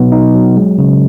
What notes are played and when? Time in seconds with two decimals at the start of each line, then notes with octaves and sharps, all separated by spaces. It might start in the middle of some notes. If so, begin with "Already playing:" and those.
Already playing: B2 F#3 B3 D#4
0.12 D#4
0.35 F#3
0.56 G#3
0.78 C#3